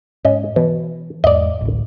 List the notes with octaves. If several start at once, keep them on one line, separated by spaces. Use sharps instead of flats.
G#2 C#4 D#5
B2 E3
E2 G#2 D5 D#5
A1 D2